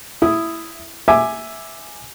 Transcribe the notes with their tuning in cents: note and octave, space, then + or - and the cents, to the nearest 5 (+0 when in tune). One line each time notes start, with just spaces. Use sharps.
E4 +5 D#6 +0
E5 +0 G#5 +0 D6 +15